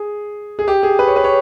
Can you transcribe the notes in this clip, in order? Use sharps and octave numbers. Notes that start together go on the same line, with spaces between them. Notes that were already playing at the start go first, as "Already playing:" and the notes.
Already playing: G#4
G#4
G4
G#4
B4
C#5
B4
C#5